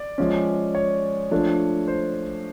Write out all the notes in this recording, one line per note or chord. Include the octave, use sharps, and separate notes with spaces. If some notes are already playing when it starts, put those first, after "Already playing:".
Already playing: D5
F3 G#3 C#4
C#5
F3 A3 D4
C5